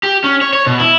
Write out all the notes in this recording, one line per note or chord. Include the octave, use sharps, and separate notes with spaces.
G4
C#4
C#5
C#5
B2
E4